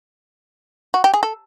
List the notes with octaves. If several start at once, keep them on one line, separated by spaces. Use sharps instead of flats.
F#4
G4
G#4
A4